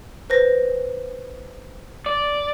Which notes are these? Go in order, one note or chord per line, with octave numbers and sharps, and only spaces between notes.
B4 C5 A#6
D5